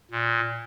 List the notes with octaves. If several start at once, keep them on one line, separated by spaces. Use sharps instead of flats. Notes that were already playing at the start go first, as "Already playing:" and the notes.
A#2